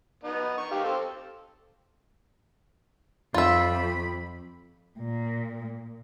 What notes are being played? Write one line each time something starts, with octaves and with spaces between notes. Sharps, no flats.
B3 D#4
A#4 C#6
D#4 G4 F5
C4 A4
F2 F4 E5 B5
A#2